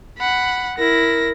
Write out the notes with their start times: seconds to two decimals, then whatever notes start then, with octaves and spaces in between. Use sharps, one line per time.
0.18 F#5 B5
0.78 E4 A#4 A#6